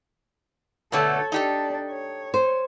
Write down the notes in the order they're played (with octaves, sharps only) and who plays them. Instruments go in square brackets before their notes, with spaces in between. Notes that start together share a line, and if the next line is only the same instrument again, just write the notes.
[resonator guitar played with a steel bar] B2 D3 A3 [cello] A4 C#5
[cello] D4 [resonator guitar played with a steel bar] D#4 G4 A4
[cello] C#5
[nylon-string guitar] C5